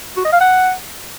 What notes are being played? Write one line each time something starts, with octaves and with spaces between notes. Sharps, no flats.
F#4
D#5
F5
F#5